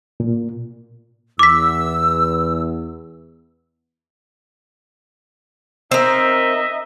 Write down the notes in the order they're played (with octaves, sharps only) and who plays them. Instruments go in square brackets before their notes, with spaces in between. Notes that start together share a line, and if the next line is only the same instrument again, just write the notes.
[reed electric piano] A#2
[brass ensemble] E2 [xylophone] D6 B6 [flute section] E6
[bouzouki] C4 A#4 [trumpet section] D#4 D#5 E5